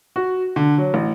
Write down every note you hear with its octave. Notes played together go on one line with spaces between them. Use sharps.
F#4
D3
F#3
A1